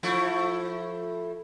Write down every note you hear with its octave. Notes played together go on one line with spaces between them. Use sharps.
F3 A3 E4